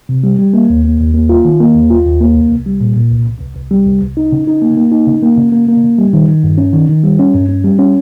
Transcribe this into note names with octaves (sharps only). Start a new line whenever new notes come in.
C3
G3
G3
A#3
D#2
A#3
D#2
A#3
F4
D#3
A#3
D#2
F4
D#2
A#3
C2
C2
G3
A#2
A#2
C2
C2
C2
C2
G3
C2
C2
D#4
C#3
D#4
A#3
A#3
D#4
C#3
A#3
C#3
A#3
A#3
C#3
G3
D#3
D#3
G2
C#4
D#3
D#3
G3
C#4
G2
C#4
G3
C#4